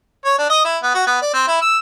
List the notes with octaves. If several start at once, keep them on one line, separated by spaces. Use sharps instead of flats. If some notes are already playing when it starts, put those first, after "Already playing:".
C#5
D4
D#5
E4
B3
F#4
B3
D5
C4
E4
E6